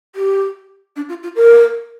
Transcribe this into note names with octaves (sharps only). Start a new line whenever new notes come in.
G4
D4
F4
F4
A#4